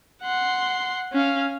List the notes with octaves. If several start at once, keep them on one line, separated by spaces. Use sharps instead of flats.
F#5 C6
C#4 F5